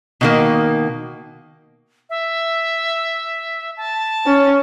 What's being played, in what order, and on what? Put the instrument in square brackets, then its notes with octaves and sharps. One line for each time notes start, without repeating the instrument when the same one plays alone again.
[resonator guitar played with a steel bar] B2 D#3 A#3
[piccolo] E5
A5
[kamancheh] C#4